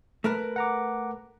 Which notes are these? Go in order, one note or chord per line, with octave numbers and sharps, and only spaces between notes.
A3 A#4 B4
F#5 A#5 D6